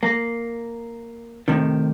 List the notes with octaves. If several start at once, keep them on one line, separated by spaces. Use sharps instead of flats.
A#3
A2 C3 D#3